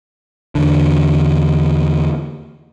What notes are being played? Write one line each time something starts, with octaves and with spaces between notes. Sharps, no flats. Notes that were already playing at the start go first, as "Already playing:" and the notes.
E2 D3